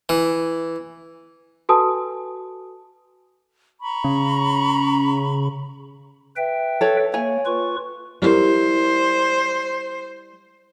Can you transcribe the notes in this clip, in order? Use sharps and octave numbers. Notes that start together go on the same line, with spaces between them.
E3
F#4 A4 B4 G#5 A5 D#6
A#5 B5 C#6
C#3
B4 E5 G5
A4 C#5
A#3 C#5 G#5
F4 B4 C#6
G3 E4 A#4 C5